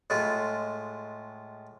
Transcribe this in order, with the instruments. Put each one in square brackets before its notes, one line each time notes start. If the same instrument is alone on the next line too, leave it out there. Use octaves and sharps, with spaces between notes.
[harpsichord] A2 G#3 F4